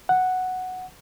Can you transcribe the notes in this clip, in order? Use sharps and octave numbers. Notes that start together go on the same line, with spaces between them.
F#5